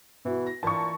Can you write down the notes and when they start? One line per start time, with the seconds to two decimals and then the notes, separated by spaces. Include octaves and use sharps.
0.25 B2 E3 E4 F#4
0.47 A#6
0.63 A#2 E3 A#4 A5 B5 C#6